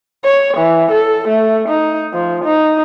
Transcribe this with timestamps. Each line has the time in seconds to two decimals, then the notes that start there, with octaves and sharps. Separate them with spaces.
0.24 C#5
0.57 E3
0.91 A4
1.28 A3
1.69 D#4
2.13 F3
2.45 D#4